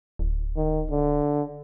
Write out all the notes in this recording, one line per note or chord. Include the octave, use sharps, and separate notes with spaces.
D1
D#3
D3